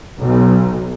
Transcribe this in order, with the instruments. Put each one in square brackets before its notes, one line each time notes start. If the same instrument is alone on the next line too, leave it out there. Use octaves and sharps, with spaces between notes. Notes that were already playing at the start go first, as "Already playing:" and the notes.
[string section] B1